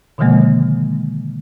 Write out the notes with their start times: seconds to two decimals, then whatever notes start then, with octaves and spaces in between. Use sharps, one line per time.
0.18 B2 D3 D#3 F3 G#3 A#3